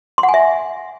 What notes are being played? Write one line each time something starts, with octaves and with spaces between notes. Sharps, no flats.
C6
F#5
G#5
E5